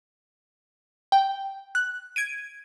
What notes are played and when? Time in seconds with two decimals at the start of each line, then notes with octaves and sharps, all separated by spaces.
1.12 G5
1.75 F#6
2.16 G#6 D7 D#7